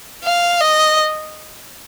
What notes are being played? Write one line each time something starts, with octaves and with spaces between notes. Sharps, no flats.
F5
D#5